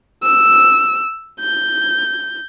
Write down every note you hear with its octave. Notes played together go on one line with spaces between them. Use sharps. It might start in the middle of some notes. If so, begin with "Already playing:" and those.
E6
G6